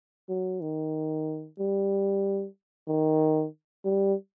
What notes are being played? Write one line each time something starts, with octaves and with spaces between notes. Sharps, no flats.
F#3
D#3
G3
D#3
G3